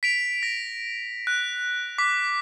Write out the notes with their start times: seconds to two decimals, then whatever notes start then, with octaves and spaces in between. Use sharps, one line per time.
0.03 B6 D7 F7
0.43 A#6
1.27 F#6
1.98 D6 B6